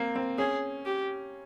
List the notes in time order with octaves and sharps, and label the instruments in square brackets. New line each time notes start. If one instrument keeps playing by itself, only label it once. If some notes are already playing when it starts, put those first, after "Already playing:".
Already playing: [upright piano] A#3 C4
C4
[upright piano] C#4 [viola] G#4
[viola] G4